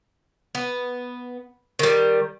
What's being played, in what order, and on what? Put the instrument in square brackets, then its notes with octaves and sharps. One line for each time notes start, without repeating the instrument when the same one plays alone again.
[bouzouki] B3
D#3 G3